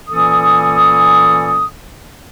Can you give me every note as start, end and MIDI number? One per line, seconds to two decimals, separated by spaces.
0.08 1.65 46
0.08 1.65 52
0.08 1.65 58
0.08 1.65 61
0.08 1.65 69
0.08 1.65 87